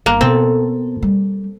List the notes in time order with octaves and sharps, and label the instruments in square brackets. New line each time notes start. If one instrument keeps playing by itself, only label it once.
[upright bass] G1 [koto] A#3
[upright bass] B2 [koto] C4 [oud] A4
[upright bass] G3